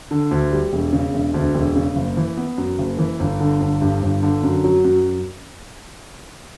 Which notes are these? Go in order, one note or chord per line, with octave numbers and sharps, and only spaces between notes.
D3
D2
G3
E1
C#3
E1
D2
E1
C#3
F#1
E3
B3
F#2
F#1
E3
G1
D3
G1
G2
G1
D3
F#2
F#3
F#2